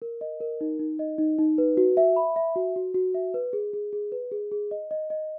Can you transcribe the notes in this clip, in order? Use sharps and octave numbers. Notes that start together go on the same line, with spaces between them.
A#4
D#5
A#4
D#4
D#4
D#5
D#4
D#4
B4
F#4
E5
B5
E5
F#4
F#4
F#4
E5
B4
G#4
G#4
G#4
B4
G#4
G#4
D#5
D#5
D#5